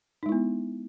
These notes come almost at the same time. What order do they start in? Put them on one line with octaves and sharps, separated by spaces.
D#4 G#3 E4 B3